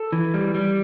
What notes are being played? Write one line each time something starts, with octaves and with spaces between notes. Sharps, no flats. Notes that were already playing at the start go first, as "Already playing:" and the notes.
Already playing: A4
E3
G3
G3